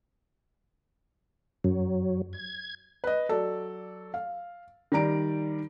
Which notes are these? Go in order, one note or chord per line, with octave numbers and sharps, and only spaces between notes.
F#2 F#3
G#6
B4 D#5
F#3 A4 D5
F5
D#3 G3 D5 A#5 D7